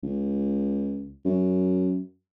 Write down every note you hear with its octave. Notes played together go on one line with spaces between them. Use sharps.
C#2
F#2